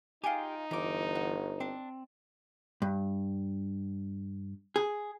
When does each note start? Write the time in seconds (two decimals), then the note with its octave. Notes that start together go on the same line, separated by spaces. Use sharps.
0.24 D#4 F4 G4 G#4 G5
0.71 G1 E3 F4 A#5 D6
1.15 F#4
1.60 C4 D4
2.82 G2
4.76 G#4